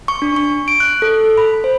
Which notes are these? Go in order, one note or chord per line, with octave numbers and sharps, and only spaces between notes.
C#6
D4
C#6
D7
F#6
A4
B5
C5